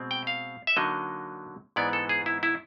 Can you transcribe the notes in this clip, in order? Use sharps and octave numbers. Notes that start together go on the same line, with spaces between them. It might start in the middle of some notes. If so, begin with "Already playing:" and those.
Already playing: B2 G#3 C4
G5
F5
E5
D3 F#3 A#3 D#4 D#5
G#2 E3 G#3 B3 D5
A4
G#4
E4
E4